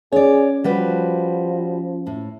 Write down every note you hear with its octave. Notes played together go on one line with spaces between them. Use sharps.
C#4 G#4 C#5 D5
F3 G3 F#4 B4
A2